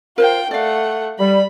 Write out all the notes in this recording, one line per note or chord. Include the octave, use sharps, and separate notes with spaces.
F4 A#4 C5 F5 G5
A3 D5 F5 F#5
G3 B5